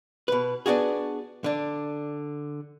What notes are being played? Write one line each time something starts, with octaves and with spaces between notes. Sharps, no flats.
B2 B4
B3 D4 F#4 G#4
D3 D4